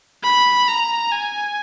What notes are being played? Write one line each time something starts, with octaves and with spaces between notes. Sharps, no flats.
B5
A#5
G#5